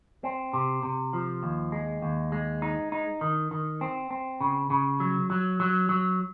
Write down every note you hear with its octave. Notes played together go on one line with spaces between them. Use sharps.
C4
C3
C3
F3
D#2
G#3
D#2
G#3
D#4
D#4
D#3
D#3
C4
C4
C#3
C#3
F#3
F#3
F#3
F#3